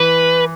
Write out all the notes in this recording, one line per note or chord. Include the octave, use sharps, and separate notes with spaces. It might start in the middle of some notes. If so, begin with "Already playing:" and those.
Already playing: E3 B4